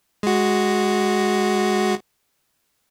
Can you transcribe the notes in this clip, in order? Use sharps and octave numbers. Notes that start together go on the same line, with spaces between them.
G#3 F#4